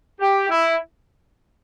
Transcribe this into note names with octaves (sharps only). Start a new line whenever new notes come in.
G4
E4